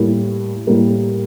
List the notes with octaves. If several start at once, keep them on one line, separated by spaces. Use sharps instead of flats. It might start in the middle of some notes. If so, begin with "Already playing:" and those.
Already playing: A2 G3 A#3
A2 G3 A#3